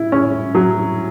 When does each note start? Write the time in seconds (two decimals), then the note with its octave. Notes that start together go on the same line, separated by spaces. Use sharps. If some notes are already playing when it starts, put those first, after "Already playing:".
Already playing: E4
0.12 C#4
0.55 F#3